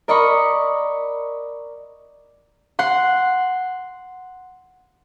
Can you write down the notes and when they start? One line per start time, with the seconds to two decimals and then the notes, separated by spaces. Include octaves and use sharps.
0.08 A#4 D5 D#5 B5 C#6
2.79 F#5 C6